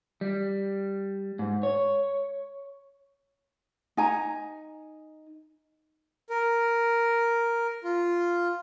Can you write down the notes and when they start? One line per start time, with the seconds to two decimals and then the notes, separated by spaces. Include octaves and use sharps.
0.21 G3
1.39 G#2
1.63 C#5
3.97 D#4 G#5 A#5
6.30 A#4
7.84 F4